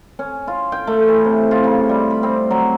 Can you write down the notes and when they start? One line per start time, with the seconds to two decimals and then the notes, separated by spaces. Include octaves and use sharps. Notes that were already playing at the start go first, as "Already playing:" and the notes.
0.19 C#4
0.47 F4
0.72 G5
0.87 A3
1.08 E3
1.25 C3
1.51 F4
1.64 C#3
1.89 G3
2.11 B5
2.23 C4
2.51 F#3